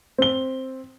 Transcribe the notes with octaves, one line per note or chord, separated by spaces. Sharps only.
C4 G7